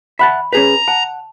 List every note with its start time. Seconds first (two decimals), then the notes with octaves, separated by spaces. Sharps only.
0.19 E5 F#5 A5 B5
0.53 C#4 G#4 B4 C#5 A#5
0.88 F#5 A5